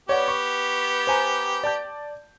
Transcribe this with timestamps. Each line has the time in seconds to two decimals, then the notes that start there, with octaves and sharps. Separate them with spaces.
0.09 B3 G4 C#5 D5 F#5
0.28 C#6
1.07 C5 G#5 A#5
1.64 D5 A5 G6